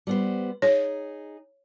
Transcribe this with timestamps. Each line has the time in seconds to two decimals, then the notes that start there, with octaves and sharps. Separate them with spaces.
0.07 G3 B3 C5
0.62 D#4 G#4 C#5